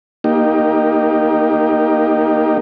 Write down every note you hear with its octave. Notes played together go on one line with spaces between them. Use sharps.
A#3 D#4 G4